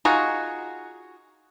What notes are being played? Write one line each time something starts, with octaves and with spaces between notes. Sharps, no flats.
D#4 F4 F#4 G#4